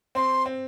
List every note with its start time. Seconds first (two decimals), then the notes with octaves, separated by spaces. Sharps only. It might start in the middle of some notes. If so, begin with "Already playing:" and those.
0.15 C4 C6
0.46 C4